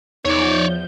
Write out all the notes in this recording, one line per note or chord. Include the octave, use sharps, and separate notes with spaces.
E2 F3 D#4 C#5 D5 G6